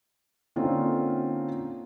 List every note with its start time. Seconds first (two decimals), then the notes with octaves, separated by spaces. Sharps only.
0.56 D3 A#3 C4 C#4 D#4 F4